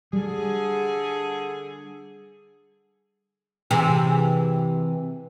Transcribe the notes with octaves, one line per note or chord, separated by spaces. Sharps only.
D3 G3 G#4
C3 E3 G#4